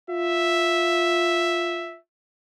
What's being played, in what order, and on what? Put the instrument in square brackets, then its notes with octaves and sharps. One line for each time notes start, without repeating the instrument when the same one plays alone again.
[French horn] F4 [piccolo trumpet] E5